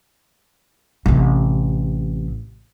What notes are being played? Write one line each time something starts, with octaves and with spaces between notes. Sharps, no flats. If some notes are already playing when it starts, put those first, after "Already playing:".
A1 C3